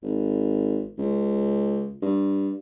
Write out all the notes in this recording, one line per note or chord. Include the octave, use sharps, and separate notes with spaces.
G#1
C#2
G2